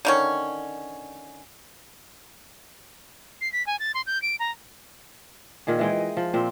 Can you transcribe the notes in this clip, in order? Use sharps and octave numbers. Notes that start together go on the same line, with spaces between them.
D3 D#3 C#4
C7
B6
G#5
A6
C6
G6
D7
A#5
A#2 D#3 G#4
E3 G#3 G5
D#5
F3
A#2 C4